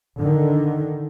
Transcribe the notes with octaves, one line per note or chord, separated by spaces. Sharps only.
D3 D#3